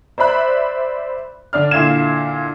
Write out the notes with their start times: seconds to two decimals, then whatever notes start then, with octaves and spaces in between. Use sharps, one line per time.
0.18 C5 D5 E5 B5 F#6
1.53 D3 D4 D5 F6
1.71 A#2 D3 E4 F5 G#6 E7